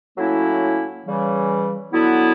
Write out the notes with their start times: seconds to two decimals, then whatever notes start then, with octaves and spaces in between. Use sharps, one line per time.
0.16 A2 F#3 A#3 C#4 E4
1.05 C#3 E3 G3
1.92 D3 F#3 B3 E4